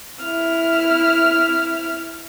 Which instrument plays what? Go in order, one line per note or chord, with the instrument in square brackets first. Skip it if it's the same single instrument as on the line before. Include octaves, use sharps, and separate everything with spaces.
[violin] E4 F6